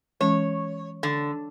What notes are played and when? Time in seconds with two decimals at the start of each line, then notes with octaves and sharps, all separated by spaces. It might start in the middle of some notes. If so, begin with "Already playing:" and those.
0.21 E3 G#3 C#4 C#5
1.03 D3